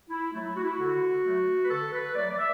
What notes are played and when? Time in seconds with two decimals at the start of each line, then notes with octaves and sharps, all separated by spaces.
0.10 E4
0.33 F#3 A3 E4
0.56 F#4
0.64 E4
0.71 F#4
0.79 D3
1.24 F#3 A3
1.62 B4
1.70 D3 A4
1.93 B4
2.15 F#3 A3 D5
2.31 D5
2.38 E5